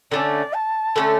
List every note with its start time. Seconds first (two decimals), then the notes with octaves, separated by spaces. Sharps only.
0.11 D3 A3 C#4 D5
0.54 A5
0.96 D3 A3 C#4